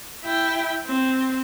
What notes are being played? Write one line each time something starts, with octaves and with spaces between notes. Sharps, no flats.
E4 G5
C4